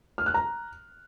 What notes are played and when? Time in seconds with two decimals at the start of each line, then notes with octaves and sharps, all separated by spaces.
0.18 F6
0.26 F#6
0.34 A#5